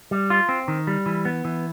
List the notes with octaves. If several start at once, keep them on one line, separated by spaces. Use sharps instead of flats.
G3
F4
C4
D#3
G3
E3
B3
E3